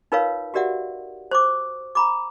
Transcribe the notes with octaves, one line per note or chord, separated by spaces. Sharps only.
D#4 F4 A#4 B4 C#5 F5
F#4 G4 A#4 D5 E5 F#5
C5 C#6 D6
A#5 B5 D6